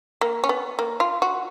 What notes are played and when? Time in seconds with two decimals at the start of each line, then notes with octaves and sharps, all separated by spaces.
0.21 A#3
0.44 C#4
0.49 B3
0.79 A#3
1.00 F4
1.22 F#4